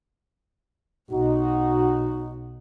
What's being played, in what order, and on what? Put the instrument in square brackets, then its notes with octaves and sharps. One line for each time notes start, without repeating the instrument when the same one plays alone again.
[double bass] B1 [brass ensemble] D#4 F#4